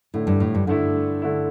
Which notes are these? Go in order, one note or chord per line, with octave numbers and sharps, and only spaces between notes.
A2 D3 A3 E4
G2
A2
G2
G2 D3 A3 E4
D3 A3 E4